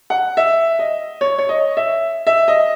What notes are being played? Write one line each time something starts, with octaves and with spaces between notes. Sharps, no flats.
F#5
E5
D#5
C#5
C#5
D#5
E5
E5
D#5